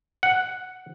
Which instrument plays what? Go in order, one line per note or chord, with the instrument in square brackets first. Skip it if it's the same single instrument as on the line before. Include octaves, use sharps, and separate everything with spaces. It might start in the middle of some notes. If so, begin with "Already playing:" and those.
[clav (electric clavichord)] F#5